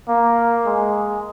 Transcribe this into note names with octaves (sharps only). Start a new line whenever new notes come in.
A#3
G#3